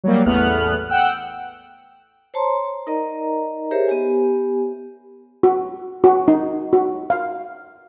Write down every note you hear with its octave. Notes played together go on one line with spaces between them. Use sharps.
F#3 G3 A#3
A1 E2 A3 B3 F6 F#6
F#5 G5 E6 F#6
C5 C#5 A5 A#5 C6
D#4 A#4 D5 D#5 A#5
G4 G#4 A#4 C5 C#5 E5
B3 G4 G#5
F#4
F#4
D#4
F#4
F5